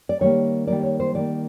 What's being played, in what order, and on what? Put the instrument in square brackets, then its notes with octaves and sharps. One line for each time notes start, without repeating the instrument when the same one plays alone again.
[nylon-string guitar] D5
D#3 G3 A#3 C#5
D#3 G3 A#3 D5
C#5
C5
D#3 G3 A#3 D5